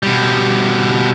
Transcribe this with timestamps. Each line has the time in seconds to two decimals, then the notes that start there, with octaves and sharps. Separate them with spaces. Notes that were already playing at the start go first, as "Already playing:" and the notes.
0.03 B2 G3